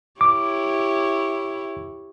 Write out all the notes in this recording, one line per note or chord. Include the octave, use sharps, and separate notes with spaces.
E4 G4 C#5 D6